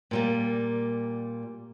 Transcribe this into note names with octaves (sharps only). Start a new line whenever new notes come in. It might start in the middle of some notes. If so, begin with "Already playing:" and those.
A#2 G3 A#3